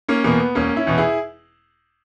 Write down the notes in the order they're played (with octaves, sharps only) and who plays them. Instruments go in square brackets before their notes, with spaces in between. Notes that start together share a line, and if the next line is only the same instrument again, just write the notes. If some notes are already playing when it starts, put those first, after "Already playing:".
[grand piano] A#3 C#4
E2 B2 A#3
B3
E1 A#3 C#4
C#4 E4
E2 B2
E4 G#4